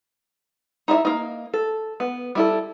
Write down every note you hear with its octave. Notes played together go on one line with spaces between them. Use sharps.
D#4 E4 D#5 E5
A#3 D#4
A4
B3
G3 E4 A4